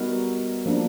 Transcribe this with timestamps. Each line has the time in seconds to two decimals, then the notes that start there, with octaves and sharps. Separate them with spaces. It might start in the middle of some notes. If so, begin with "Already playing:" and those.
Already playing: G3 B3 D#4 F#4 A#4
0.66 F3 A#3 D4